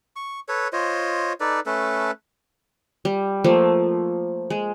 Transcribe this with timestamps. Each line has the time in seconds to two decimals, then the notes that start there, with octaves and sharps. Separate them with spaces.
0.16 C#6
0.49 A4 B4 C#5
0.73 F4 C5 C#5 D#5
1.40 D#4 A4 B4 D5
1.66 A3 C#4 A4 B4
3.05 G3
3.44 F3 A3 A#3
4.50 G#3